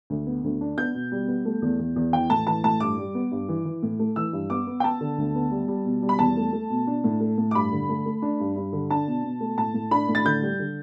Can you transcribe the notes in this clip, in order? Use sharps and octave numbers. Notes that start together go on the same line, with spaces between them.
D2
B3
D2
D4
B3 G6
B2
G3
B3
A3
E2
E2
E2
E3 G5
A2 A5
E3 A5
A2 A5
G2 D6
G3
B3
G2
E3
E3
A2
A3
E3 E6
G2
B3 D6
B3
G5
B3 A5
D3
D2
B3
G3
G3
B2
G3
B5
E2 A5
A3
A3
B2
D4
A2
A3
A2
D6
G2 B5
D3
A3
A3
D4
G2
G2
D3
D4 A5
B2
B2
A3
A2 A5
A2
D4 B5
A2
A6
D3 G6
G3
D3